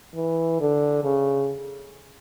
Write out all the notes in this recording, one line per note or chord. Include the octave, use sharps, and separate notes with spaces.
E3
D3
C#3